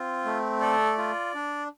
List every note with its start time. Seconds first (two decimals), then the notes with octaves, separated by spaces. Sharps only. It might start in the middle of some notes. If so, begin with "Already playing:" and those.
Already playing: C4 F4
0.25 A3
0.61 A4 D5
0.98 F4
1.35 D4